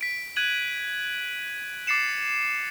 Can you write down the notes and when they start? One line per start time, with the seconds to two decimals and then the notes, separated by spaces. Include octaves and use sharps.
0.01 B6 D7
0.36 F#6 G#6 D#7 F#7
1.87 D6 A6 C7 C#7 E7